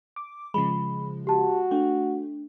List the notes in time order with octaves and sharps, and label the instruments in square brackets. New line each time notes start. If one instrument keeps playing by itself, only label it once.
[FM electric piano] D6
[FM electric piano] C#3 F3 G#3 [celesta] B5
[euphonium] F#4 [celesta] G4 A5
[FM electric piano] A3 [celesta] D4